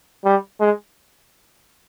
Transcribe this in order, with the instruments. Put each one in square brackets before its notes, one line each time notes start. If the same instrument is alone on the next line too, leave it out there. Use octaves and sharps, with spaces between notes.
[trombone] G3
G#3